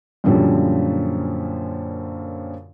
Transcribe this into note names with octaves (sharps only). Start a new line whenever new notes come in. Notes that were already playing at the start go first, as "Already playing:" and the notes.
F#2 A#2 D3 F3 G3 C#4